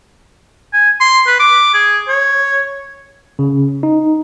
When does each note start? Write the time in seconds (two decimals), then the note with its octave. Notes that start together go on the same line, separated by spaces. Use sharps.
0.73 G#5
1.00 C6
1.27 B4
1.40 D6
1.74 G#4
2.08 C#5
3.39 C#3
3.83 D#4